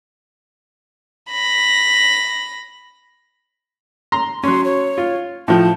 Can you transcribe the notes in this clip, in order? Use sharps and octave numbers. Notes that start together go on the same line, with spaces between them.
B5 A#6
A#5 C6
F#3 C#4 C6
C#5
F4
A2 F3 A5